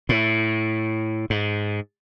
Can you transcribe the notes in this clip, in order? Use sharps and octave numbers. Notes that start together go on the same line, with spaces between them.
A2
G#2